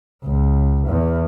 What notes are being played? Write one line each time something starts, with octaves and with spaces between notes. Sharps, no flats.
C#2
E2